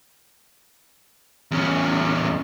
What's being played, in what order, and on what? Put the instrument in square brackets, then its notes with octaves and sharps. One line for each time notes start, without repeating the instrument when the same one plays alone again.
[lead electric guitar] E2 C#4